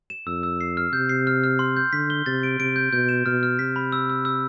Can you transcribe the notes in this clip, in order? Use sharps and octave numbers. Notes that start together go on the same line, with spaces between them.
E7
F2 E6
E6
C7
F6
C3 G6
C7
F6
F6
C6
G6
D3 B6
G7
C3 A6
D7
C3 D7
G6
B2 G6
E7
B2 F6
F6
C3 B6
B5
E6
E6
E6